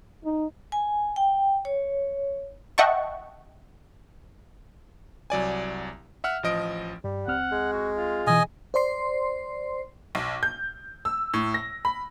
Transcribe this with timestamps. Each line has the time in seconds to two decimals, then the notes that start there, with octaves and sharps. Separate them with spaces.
0.24 D#4
0.72 G#5
1.16 G5
1.65 C#5
2.78 D#5 E5 F#5 G5 A5 C#6
5.30 C2 F#3 D5 G#5
6.24 E5 F#5 F6
6.43 A1 F3 D#5 D7
7.04 G2 G3
7.27 C#2 C4 F#5 F6
7.52 G#3
7.73 F#4
7.97 F4
8.27 B2 E3 D#5 G#5
8.74 C5 D5 C6 C7
10.15 B1
10.43 G6
11.05 E6
11.34 A2
11.54 A#6
11.85 B5